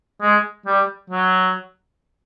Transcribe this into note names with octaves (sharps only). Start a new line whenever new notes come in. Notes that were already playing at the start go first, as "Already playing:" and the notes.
G#3
G3
F#3